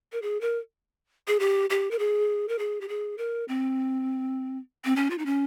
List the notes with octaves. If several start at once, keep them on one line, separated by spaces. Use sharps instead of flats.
A#4
G#4
A#4
G#4
G4
G4
A#4
G#4
A#4
G#4
G4
G#4
A#4
C4
C4
C#4
F4
D#4
C#4